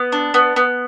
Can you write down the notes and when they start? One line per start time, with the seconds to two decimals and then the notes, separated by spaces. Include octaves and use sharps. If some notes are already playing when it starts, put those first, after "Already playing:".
Already playing: B3
0.12 D4
0.34 B3
0.56 B3